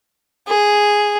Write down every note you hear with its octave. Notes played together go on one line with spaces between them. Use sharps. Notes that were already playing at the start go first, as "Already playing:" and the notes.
G#4